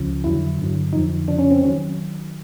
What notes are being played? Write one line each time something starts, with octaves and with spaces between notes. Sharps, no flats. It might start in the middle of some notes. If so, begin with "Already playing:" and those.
Already playing: C#2 C#3 F3
F2 D3 F#3 E4
G2 D3 F#3
F2 D3 F3 D#4
F2 C#3 F3 D4
C#4
C4
D#3 F#3 C#4